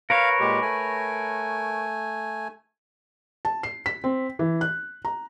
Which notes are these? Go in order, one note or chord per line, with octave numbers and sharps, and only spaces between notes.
A#4 B4 C#5 F5
A#2 G#3 G4
A3 G#5
A5
C7
B6
C4
E3
F#6
A#5